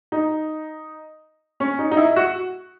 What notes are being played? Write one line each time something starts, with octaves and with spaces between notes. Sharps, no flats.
D#4
C#4
D#4
D#4
E4
F#4